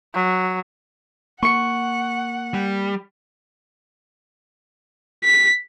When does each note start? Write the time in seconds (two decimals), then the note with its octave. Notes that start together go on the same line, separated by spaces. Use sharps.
0.15 F#3
1.42 A#3 F#5 C#6 C#7
2.54 G3
5.24 B6